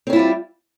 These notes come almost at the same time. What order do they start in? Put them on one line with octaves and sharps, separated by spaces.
C4 C#4 E4 F4 G3